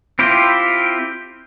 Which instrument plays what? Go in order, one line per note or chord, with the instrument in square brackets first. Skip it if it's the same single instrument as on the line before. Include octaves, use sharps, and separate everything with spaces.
[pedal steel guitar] C4 E4 F4 G4 C5